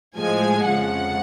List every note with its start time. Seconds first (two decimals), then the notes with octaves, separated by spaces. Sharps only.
0.17 A2 F3 G#3 G#5
0.65 F2 C#3 F3 G#3 F#5